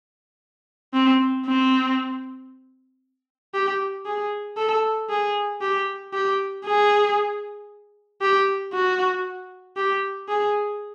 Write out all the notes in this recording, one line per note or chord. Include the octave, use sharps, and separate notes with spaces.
C4
C4
G4
G#4
A4
G#4
G4
G4
G#4
G4
F#4
G4
G#4